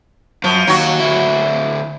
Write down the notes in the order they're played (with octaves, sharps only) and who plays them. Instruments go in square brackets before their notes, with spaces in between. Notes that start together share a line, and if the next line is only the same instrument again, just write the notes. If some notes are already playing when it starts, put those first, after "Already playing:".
[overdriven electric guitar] F#2 [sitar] F3
[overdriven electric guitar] D#2 [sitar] F#3 F#4
[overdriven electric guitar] D2 E4